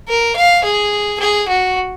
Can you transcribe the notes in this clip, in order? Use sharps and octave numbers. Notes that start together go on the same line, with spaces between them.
A#4
F5
G#4
G#4
F#4